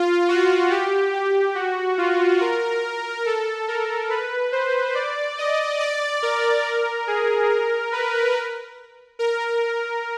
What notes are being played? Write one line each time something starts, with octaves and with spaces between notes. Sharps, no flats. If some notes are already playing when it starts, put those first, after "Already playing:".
Already playing: F4
F#4
G4
G4
F#4
F4
A#4
A4
A#4
B4
C5
D5
D#5
D5
A#4
A#4
G#4
A#4
B4
A#4